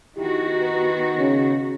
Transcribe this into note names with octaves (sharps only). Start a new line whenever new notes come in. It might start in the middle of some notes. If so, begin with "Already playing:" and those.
D#3 B3 E4 F#4 G4
B4
C#3 C#4